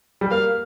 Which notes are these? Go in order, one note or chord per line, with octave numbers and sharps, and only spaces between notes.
G3
A#3 F5